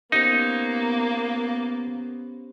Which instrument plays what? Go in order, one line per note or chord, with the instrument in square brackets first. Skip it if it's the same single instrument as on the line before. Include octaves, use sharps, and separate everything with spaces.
[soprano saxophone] A#3 [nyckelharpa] B3 [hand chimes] C#4 G4 C5 [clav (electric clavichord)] D#4